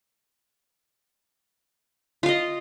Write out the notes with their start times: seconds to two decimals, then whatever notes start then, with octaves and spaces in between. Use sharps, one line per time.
2.23 F4
2.26 F5
2.29 D#5